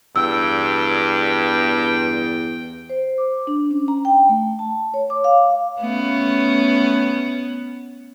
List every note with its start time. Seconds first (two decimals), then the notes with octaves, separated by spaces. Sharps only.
0.16 E2 G2 G5 E6
2.90 C5
3.18 D6
3.47 D4
3.71 C#4
3.88 A#5
4.05 G5
4.29 A3
4.59 A5
4.94 C#5
5.10 D6
5.24 F5
5.81 A3 B3 C#4